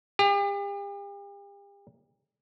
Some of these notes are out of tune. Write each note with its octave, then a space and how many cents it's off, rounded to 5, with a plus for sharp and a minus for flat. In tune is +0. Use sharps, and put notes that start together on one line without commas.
G4 +40